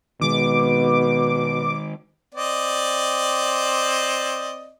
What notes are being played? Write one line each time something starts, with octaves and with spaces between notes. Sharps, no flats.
B2 D#3 G#3 D6
C4 D5 D#5